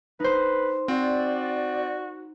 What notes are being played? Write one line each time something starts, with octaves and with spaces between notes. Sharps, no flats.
D#4 B4 C5
C4 F#4 D5